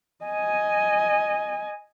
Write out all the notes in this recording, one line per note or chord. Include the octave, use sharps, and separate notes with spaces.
D#5 G#5